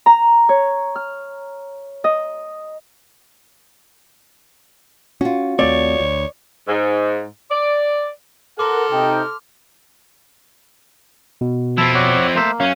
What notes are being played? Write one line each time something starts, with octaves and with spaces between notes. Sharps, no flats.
A#5
C#5
F6
D#5
C#4 F4 F#4
D#2 A3 C4 C#5 D5
D2
G#2
D5
A4 A#4 F#5 A5 C6 D6 F6
C3 D#4 G5
B2
F3 C4 E4 A5 B5 E6
C#5 D5 F#5
A3 A#3 C5 E5
F#2 C#4 F5